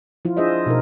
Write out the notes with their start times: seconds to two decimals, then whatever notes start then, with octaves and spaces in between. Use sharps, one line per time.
0.25 F3 E4 F4
0.37 D4 F4 G#4 C5 D#5 E5
0.66 B2 D#4 A#4